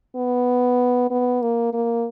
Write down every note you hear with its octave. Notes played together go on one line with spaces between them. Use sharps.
B3
B3
A#3
A#3